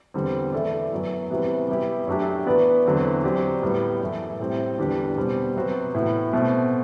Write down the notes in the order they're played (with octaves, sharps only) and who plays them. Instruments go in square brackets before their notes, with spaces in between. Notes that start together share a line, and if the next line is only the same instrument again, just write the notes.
[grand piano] E2 D3 G3 C4
E3 A3 E4 A4 D5
F#2 F#3 B3 E4
C3 E3 G3 B3 F#4
G3 B3 E4 G4
F#2 F#3 A3 D4 G4
E3 B3 F#4 B4 D5
E2 D3 F#3 C4 E4
F#3 C4 G4 D5
A2 G3 B3
F#2 E3 A3
A2 G3 C4
E2 D3 G3 D4 G4
B2 G3 C4
C3 F#3 B3 F#4 C5
A2 E3 B3 E4
B2 A3 C4